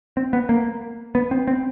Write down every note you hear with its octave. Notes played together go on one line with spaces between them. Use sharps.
C4
B3
A#3
B3
C4
C4